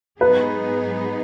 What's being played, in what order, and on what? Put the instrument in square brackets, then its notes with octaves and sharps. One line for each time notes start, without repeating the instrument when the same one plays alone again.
[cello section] G#2 F#3 B3 D#4 G#4 [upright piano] B4